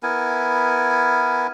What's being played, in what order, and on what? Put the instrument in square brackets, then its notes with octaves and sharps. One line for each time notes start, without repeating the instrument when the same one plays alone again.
[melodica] B3 E4 A#4 G#5